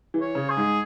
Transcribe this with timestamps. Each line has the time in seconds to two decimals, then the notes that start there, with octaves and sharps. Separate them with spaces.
0.14 E3
0.21 C#5
0.35 C#3
0.50 G#4
0.57 G#2